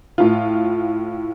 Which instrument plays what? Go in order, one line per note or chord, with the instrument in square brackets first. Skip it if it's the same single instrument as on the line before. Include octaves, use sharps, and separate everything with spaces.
[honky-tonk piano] A2 F4